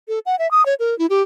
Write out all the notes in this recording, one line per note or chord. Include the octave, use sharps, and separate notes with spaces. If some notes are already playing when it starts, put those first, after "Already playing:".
A4
F#5
E5
D#6
C#5
A#4
E4
G4